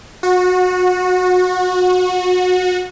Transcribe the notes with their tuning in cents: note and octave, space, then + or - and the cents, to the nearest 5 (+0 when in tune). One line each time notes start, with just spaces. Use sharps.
F#4 -25